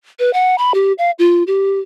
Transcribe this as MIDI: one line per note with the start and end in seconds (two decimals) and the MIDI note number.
0.19 0.33 71
0.33 0.56 78
0.58 0.72 83
0.74 0.93 67
0.98 1.11 77
1.19 1.43 65
1.47 1.79 67